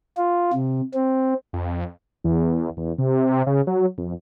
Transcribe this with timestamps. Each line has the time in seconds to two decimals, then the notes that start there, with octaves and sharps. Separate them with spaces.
0.17 F4
0.53 C3
0.94 C4
1.53 F2
2.24 E2
2.77 E2
2.98 C3
3.47 C#3
3.67 F#3
3.98 F2